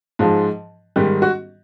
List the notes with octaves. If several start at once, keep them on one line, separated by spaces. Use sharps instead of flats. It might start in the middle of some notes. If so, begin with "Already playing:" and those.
G#2 F3 G#3
G#2 D#3 G3 G4
F#4